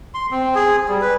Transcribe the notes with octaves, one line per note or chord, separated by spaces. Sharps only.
C6
C4
G#4
G3
B4